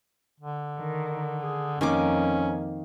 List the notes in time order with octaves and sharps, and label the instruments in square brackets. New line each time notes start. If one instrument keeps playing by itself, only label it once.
[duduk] D3
[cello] D#3
G#4
[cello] F2 [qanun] D#3 A#3 D6 [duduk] C#4